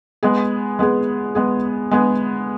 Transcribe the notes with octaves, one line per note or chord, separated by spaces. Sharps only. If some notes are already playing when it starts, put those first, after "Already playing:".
G#3 B3 G#4
G#3 B3 G#4
G#3 B3 G#4
G#3 B3 G#4